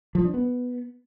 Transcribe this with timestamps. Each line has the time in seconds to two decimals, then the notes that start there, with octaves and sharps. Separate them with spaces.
0.15 F3
0.24 D4
0.34 B3